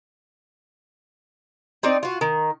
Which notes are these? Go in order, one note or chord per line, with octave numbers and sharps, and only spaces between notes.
C4 D#4 D5
F4 F#4
D#3